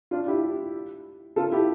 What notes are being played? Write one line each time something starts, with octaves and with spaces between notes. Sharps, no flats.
D4 F4
E4 G4
F4 A4
E4 G4